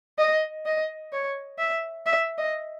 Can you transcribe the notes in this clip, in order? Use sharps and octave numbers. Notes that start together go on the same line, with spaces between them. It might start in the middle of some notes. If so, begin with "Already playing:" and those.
D#5
D#5
C#5
E5
E5
D#5